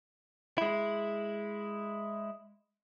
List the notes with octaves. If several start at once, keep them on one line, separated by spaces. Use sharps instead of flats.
G#3 E4